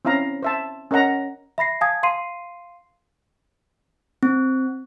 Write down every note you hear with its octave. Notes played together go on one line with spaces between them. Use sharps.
C4 C#4 E4 F5 A#5
C5 E5 A5
C#4 A#4 D#5 F#5 A#5
E5 B5 A#6 C7
F5 G#5 A5 D#6 G#6
F5 C6 C7 D#7
C4